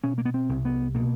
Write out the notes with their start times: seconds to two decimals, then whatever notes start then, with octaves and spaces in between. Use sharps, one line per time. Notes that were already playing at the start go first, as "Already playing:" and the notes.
0.03 B2 C#4
0.18 A#3
0.25 B3
0.34 C4
0.49 C2
0.65 B3
0.95 B2 A#3